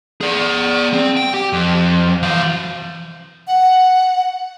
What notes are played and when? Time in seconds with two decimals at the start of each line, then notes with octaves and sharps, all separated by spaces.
0.21 G#4 D5
0.93 C4
1.17 G5
1.34 G4
1.53 F2
2.23 E3 F5
3.47 F#5